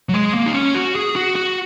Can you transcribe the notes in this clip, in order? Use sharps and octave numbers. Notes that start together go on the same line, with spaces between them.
F#3
G#3
A#3
D#4
C#4
F#4
G#4
F#4
F#4